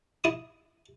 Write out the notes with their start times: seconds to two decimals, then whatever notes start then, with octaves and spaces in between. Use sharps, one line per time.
0.24 E4 D#6